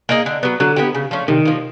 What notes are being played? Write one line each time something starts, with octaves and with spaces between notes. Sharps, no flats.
A#3 D#4 G#4
D3
F#3 B3
D3 F#3
B3 E4 G4
C#3
F3 A3 C#4
C3 D#3
F3 A#3